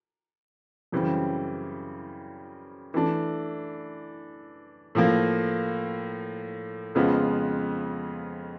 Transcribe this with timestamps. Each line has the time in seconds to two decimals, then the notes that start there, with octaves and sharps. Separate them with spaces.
0.92 F#2 C#3 E3 G3 C4
2.94 E3 A3 D4
4.95 A2 F3 A#3
6.95 F2 C#3 F3 G#3 B3